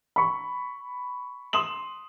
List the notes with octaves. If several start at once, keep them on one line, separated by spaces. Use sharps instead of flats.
B5 C#6
C6 D#6 E7 F#7